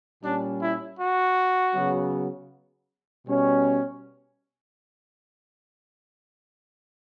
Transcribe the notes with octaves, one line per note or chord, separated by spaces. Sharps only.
A#2 G3 C#4 D4
E4
F#4
C#3 F#3 B3
B2 G3 C#4